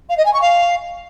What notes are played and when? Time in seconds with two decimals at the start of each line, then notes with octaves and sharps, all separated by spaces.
0.09 F5
0.17 D#5
0.25 G#5
0.33 C#6
0.41 F5